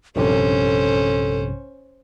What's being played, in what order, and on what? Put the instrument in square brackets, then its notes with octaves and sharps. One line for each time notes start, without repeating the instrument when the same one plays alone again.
[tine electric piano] A#1 G2 C3 [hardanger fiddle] C#4 C5 [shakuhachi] A4